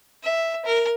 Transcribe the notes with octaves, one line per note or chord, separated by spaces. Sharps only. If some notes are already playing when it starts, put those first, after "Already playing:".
E5
A#4